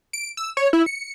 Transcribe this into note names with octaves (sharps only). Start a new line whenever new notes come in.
D7
E6
C#5
E4
C#7